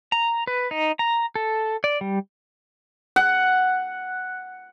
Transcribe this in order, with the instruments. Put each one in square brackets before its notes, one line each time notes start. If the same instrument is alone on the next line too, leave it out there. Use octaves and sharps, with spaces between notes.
[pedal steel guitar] A#5
B4
D#4
A#5
A4
D5
G3
[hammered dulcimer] F#5